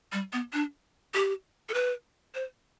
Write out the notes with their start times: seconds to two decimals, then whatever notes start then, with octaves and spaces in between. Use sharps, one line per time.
0.13 G3
0.33 B3
0.53 D4
1.15 G4
1.69 A4
1.74 B4
2.35 C5